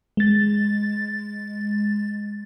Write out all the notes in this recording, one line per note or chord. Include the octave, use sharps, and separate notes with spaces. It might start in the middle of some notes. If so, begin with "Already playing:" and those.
G#3 A6